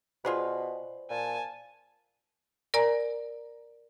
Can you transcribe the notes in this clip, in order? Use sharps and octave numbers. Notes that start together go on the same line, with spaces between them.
B2 F4 G#4 B4 C5 D5
A#2 G#5 A5
A#4 D5 G#5 A#5